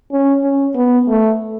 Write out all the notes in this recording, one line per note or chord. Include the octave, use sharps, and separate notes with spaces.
C#4
C#4
B3
A3